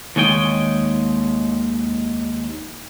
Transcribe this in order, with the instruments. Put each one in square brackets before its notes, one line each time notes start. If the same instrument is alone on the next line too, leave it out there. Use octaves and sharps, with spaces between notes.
[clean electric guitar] D#2 D#3 G#3 C#5 D#5 G5